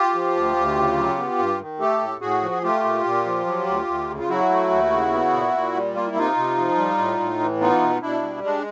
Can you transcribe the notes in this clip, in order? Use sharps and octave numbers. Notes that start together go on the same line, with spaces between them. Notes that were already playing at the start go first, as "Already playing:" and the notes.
Already playing: F4 G4
F3
D2
D2
C#3
F#3
B3
G2
D#3
A3 G4 A4
A2
A2 F#4 G#4
F3
G#4
A3 F4 G4
A#2
A#2
F3
F#3
D2
D2
C#3
F4
F#3 E4 F#4
A3
D#2
C#3
B3
A#2
A#2
G3
A#3 F4
E4
C3 D#4 F4
C3
F3
G3
A2
A2
E3
B3 D#4 F4
B2
B2 D4 E4
G3
G#3 D4